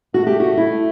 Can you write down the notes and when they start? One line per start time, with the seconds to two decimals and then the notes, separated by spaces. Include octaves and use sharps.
0.14 A3 F#4
0.27 G4
0.40 F#4
0.57 E4